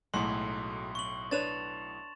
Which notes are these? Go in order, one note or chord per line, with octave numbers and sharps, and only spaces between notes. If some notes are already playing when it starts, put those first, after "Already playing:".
B1 A2 F#3 G#3 A3 C6
C#6 F#7
D4 B4 C#5 A6 E7 F7